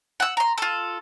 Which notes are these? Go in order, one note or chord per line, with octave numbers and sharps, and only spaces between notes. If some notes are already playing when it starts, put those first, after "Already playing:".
F#5 E6
A#5 C6
F4 A4